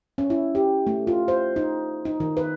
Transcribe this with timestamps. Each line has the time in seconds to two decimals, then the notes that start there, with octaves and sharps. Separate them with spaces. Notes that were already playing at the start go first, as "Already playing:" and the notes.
0.18 C#4
0.30 E4
0.55 G4
0.87 A3
1.07 F4
1.28 C5
1.56 D#4
2.05 D#4
2.20 D#3
2.37 B4